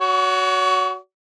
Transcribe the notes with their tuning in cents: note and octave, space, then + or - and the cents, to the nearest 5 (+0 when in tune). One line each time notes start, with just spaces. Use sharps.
F#4 +0 C#5 +35